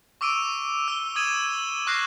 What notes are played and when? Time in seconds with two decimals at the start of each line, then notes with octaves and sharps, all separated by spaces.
0.21 C#6 D6 E6 D7 D#7
0.88 E6 G7
1.16 D#6 G#6 D#7 E7
1.87 C#6 F6 F#6 A#6 C7 D#7